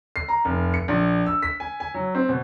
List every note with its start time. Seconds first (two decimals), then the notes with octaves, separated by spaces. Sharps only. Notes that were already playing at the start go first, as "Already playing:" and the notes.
0.16 C7
0.29 A#5
0.45 F1
0.74 C#7
0.88 A#1
1.26 E6
1.42 B6
1.60 G#5
1.80 G#5
1.94 F#3
2.15 C4
2.29 B2